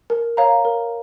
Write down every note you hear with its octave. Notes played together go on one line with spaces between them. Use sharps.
A#4
C#5 F5 A#5
A#4